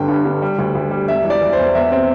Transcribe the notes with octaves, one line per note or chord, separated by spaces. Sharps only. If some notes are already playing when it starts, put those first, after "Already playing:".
Already playing: G1 D3 G3 G5
G2
D3
G3
D2
D2
G3
E1 E5
E3
D5
E3
C5
E2
E2 E5
C4